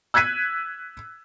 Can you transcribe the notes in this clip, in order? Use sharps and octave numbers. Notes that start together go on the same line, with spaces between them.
E6 F#6 G#6 B6 D#7